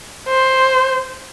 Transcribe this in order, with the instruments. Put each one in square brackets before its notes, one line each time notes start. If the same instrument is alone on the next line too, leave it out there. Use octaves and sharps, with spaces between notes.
[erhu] C5